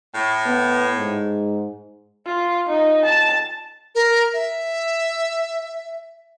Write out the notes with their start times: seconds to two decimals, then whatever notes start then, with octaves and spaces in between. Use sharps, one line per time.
0.15 A2
0.46 B3
0.97 G#2
2.26 F4
2.69 D#4
3.05 A5
3.95 A#4
4.34 E5